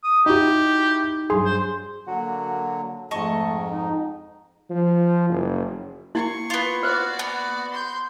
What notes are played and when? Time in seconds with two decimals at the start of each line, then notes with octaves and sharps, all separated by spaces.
0.04 D#6
0.26 D#4 E4 F#4 G4
1.30 G2 F#3 G#4 C6
1.45 C5
2.07 D3 F#3 A#3 F#4
3.11 F2 G#2 G#3 A3 D#5 A5 C#6
3.70 D#4
4.70 F3
5.30 F#1
6.15 A#3 E4 C#6 G#6 C7
6.50 B3 F4
6.83 F#4 B4 C5 D5
7.19 B3
7.70 C6 G6